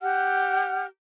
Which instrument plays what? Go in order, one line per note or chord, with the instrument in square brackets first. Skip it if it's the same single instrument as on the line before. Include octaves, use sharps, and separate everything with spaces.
[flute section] G4 F#5 F6